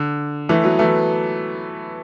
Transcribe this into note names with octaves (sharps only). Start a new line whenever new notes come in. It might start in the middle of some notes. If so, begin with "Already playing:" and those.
Already playing: D3
E3 A3
F#3 B3
E3 A3